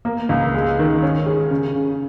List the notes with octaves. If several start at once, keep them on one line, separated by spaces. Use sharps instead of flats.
A#3
C#2
G#3
D#3
C#4
G#4
C#3
C#3